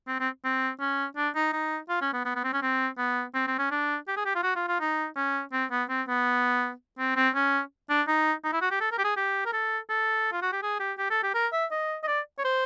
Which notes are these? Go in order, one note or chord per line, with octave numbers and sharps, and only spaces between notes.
C4
C4
C4
C#4
D4
D#4
D#4
F4
C#4
B3
B3
B3
C4
C#4
C4
B3
C4
C4
C#4
D4
G4
G#4
G4
F4
F#4
F4
F4
D#4
C#4
C4
B3
C4
B3
C4
C4
C#4
D4
D#4
D#4
E4
F#4
G4
A4
A#4
G4
G#4
G4
A#4
A4
A4
F4
F#4
G4
G#4
G4
G4
A4
G4
A#4
E5
D#5
D#5
D5
C#5
C5